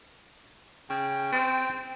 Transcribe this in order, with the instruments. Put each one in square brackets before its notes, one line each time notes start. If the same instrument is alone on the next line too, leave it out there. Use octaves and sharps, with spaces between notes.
[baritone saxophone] C#3 [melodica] G5
[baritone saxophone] C4